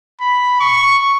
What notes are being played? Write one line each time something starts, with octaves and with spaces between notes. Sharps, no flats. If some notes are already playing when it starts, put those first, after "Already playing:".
B5
C#6